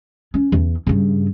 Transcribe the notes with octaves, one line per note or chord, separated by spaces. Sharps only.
C#4
E2
G2 C#3